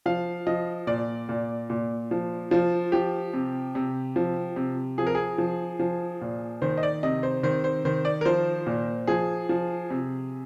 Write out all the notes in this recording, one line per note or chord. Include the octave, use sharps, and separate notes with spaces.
F3 F5
F3 D#5
A#2 D5
A#2
A#2
F3
F3 F4
F3 G4
C3
C3
F3
C3
F3 G#4
A#4
G#4
F3
F3
A#2
D#3 C5
D#5
D5
C3 D#5
C5
D#3 C5
C5
D#3 C5
D5
A#4
F3 C5
A#2
F3 G#4
F3
C3